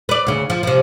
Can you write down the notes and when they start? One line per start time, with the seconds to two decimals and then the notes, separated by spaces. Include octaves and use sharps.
0.09 B4 D5
0.27 D2 C#3
0.50 F3
0.63 C3 F3